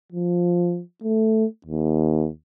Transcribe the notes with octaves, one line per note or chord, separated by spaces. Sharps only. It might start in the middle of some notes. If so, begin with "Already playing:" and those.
F3
A3
D#2